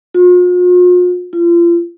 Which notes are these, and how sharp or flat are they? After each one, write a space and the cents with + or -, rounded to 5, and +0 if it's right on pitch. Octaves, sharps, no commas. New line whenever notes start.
F4 +45
F4 -35